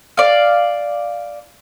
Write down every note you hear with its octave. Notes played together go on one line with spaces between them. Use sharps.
D5 F5